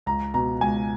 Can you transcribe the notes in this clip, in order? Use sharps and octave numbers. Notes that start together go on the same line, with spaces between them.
C#2 A#5
B2 A#5
C#2 G#5